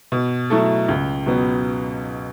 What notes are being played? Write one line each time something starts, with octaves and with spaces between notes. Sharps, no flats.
B2
F#3 A3 E4 A4
C#2
B2 F#3 B3